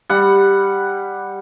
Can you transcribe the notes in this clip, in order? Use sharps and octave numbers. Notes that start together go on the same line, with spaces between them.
G3 F#5